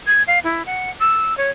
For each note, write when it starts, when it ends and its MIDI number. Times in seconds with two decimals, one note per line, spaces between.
0.07 0.23 92
0.27 0.39 77
0.44 0.63 64
0.66 0.90 78
1.00 1.37 88
1.37 1.50 73